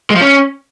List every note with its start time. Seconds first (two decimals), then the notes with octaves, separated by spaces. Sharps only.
0.10 G#3
0.16 F3
0.21 C#4